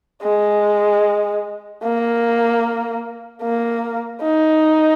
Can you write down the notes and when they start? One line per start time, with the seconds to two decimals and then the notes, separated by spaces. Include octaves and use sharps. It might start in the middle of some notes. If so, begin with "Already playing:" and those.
0.23 G#3
1.83 A#3
3.42 A#3
4.22 D#4